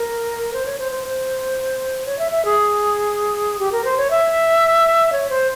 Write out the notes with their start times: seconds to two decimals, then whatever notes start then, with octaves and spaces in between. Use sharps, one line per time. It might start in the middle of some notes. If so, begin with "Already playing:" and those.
Already playing: A#4
0.53 C5
0.66 C#5
0.79 C5
0.92 C5
1.04 C5
2.06 C#5
2.19 E5
2.32 E5
2.45 G#4
3.59 G4
3.72 A#4
3.85 C5
3.98 C#5
4.11 E5
5.12 C#5
5.30 C5